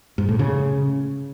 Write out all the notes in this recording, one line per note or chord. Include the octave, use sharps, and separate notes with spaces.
G#2
A2
C#3